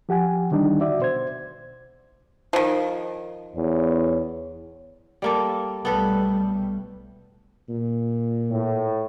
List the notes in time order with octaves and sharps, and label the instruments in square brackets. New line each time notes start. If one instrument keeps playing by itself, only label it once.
[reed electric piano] F3 G4 F#5 G#5
D3 D#3 G3 D4 D#4
F#4 D5 E5
B2 C5 G#6
[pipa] D#3 F3
[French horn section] E2 C#5
[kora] G3 A#3 A4
[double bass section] B1 G3 A3 [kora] B3 A4 B4
[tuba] A#2
[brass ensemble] A2